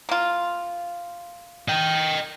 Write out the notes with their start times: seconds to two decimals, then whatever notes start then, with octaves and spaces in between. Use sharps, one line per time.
0.09 A#3 F4
1.68 D#5 G5